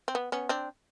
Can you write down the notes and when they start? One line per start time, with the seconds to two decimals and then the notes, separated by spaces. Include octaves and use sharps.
0.08 C4
0.15 B3
0.32 B3 C#4
0.49 C4 D4